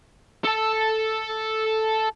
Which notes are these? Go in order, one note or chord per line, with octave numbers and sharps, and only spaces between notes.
A4 A5